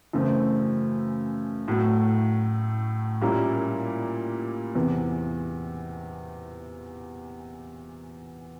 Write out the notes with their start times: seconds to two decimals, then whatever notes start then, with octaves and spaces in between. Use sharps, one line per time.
0.13 F#2 C#3 E3 A3 C4
1.68 A2 F#3 A3
3.21 A#2 G3 A#3 C#4 E4
4.75 E2 C3 E3